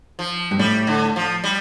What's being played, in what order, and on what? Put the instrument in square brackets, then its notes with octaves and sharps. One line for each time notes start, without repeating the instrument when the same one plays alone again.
[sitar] F3
[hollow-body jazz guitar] G2
[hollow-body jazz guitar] A2 [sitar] G3
[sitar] D3
F3
G3